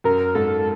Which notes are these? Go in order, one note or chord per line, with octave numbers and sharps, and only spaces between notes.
F#2 A#4
G#2 A4